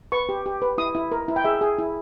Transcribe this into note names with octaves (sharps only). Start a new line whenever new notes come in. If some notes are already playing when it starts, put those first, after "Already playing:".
B4 C#6
G4
G4
B4
E4 D#6
E4
A#4
E4
G5
G#4 E5
G#4
E4